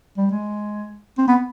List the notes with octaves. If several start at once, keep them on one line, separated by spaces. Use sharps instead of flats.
G3
G#3
C4
B3